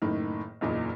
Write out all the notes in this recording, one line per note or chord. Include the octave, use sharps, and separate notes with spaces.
F#1 A2 D#3
F#1 E2 A#2 D#4